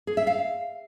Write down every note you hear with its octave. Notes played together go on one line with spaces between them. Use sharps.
G#4
E5
F5